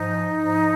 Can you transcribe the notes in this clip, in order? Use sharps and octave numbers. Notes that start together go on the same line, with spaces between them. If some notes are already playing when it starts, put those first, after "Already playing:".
Already playing: G#2 F3 D#4
G#2 F3